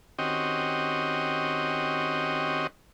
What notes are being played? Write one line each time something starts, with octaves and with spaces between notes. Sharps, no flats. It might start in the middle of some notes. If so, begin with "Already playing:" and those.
D#3 C4 C#4 F#4 G4 D#5